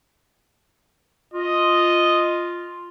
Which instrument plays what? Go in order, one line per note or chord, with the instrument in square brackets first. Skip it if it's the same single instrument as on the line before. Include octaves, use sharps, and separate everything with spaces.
[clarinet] F4 [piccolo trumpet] D#5